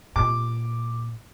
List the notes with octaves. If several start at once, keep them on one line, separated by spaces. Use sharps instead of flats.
A#2 D6